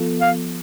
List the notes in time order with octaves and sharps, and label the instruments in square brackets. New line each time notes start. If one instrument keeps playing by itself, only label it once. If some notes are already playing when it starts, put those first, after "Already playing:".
Already playing: [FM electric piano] F3 B3 F4 A4
[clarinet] F5